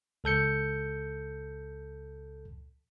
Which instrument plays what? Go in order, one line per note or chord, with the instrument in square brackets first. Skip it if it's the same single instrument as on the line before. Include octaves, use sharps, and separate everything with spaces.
[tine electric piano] C#2 A4 G6 C#7